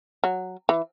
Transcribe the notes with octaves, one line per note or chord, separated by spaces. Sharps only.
F#3
E3